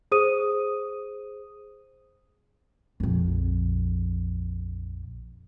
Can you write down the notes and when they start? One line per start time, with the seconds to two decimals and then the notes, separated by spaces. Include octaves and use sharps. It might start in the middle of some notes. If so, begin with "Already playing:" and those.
0.12 G#4 C5 D#6 D#7
3.00 A#1 F2